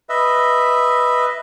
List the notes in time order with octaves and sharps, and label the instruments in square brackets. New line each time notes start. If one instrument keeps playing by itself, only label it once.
[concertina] B4 D#5 E5